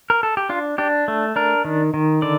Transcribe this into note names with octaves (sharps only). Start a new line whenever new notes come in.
A#4
A4
G4
D4 F4
D4 G4
A3
D4 A#4
D#3
D#3
D3 D5